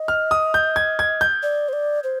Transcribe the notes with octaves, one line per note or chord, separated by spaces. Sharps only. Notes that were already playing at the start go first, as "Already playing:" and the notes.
Already playing: D#5
F6
D#6
G6
G#6
G#6
G6
D5
C5
D5
C5